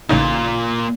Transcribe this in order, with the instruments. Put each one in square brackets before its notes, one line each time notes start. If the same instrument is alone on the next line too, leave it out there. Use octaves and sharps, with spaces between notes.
[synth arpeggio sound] A1 C#3 D#4 [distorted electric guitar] A#2 F4